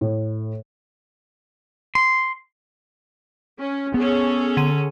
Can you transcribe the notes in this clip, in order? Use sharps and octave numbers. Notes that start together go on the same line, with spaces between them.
A2
C6
C#4
B3 C#4 G#4 A4
D3 D#7